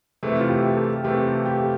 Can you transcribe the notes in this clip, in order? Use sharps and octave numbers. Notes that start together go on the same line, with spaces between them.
C3 E3 A3
E4
F4
G4
A4
C3 E3 A3 G4
G4